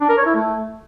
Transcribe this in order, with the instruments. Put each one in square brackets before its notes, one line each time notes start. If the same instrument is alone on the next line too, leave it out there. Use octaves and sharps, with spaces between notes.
[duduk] D4
A#4
C#5
E4
A3